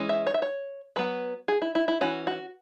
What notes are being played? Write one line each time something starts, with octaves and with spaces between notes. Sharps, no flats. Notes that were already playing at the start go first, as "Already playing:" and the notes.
Already playing: E3 G#3 C#4
E5
C#5
E5
C#5
F#3 B3 B4
G#4
E4
E4
E4
E3 C#4 F#4
F#4